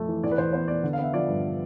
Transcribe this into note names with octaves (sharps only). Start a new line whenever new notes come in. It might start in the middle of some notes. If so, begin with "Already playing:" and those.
Already playing: F2 A3
E3
E2 D5
B4
E2 C5
B3 C5
B3 D5
D3
F5
B3 E5
F3 D5
G2